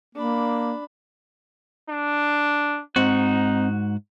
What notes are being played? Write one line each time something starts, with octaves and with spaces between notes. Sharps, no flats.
A#3 D4 B5
D4
G#2 C4 D#4 F#4